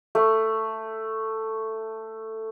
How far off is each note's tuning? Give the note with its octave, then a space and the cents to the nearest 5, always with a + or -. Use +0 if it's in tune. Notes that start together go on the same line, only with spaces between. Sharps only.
A3 +10